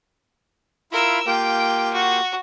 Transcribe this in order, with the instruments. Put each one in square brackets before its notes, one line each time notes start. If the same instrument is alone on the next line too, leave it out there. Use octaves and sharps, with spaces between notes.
[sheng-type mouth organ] E4 F4 B5 [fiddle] A#4 E6
[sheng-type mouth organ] A#3 F4 G4 [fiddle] G5
[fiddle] F#4